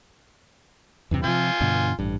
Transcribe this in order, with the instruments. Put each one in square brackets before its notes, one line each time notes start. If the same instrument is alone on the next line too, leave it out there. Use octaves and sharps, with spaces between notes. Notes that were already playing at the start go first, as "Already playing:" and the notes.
[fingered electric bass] E2 G2 C3
[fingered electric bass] C3 F3 [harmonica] F4 G#5
[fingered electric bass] G2 B2 D3
A1 G2